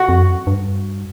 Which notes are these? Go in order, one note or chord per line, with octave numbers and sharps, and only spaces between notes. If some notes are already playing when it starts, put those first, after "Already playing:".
Already playing: F#4
F2
F#2
G2